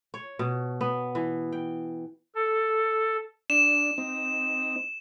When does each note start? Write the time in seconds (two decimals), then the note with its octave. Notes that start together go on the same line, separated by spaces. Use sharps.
0.14 C#5
0.39 B2
0.81 B3
1.15 E3
1.52 G5
2.35 A4
3.50 D4 E7
3.98 C4 D#4